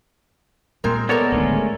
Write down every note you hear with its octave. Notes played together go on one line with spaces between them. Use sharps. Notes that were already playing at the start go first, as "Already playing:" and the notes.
A#2 G3 G#3 C4 A#4
G#3 B3 A4 A#4 C#5 D5
D1 D2 D#3 G#3 A3 C#4